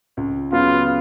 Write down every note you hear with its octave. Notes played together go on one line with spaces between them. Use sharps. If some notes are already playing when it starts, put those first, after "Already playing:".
C#2
C#3 F#3 B3 F4